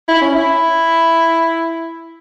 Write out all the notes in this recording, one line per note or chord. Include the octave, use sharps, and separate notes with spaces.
E4
C#4
E4